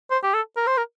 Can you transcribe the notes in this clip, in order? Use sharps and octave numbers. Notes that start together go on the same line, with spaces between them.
C5
G4
A4
A#4
C5
A#4